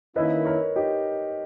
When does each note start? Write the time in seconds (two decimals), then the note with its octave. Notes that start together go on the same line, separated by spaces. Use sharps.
0.16 D#3 A#3 C#4 E4 B4 D#5
0.45 A#4 C#5
0.76 D#4 G4